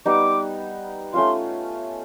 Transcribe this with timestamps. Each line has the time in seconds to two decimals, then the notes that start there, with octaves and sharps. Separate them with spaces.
0.06 G3 B3 D#4 D6
1.14 A3 C#4 F4 C6